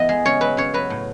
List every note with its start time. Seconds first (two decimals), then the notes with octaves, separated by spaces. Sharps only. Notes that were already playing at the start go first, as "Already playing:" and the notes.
Already playing: E3 B3 D#5
0.09 G#3
0.25 C#3 C#5
0.41 F#3 B4
0.57 C#3 C#5
0.74 F#3 B4
0.90 A2